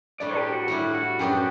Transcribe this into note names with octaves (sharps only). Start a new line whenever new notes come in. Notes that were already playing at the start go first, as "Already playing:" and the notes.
A2 G3 D4 D5
G4
F#4
A2 G3 D4 E4
F#4
F#2 F#3 B3 D4 G4